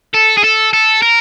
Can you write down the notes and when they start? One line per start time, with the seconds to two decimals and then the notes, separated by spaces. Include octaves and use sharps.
0.14 A4
0.37 G#4
0.43 A4
0.73 A4
1.02 A#4